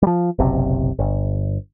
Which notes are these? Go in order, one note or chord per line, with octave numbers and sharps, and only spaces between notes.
F3 G3
F#1 B1 C3
G1